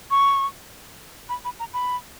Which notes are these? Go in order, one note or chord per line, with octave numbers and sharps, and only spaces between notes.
C#6
B5
B5
A#5
B5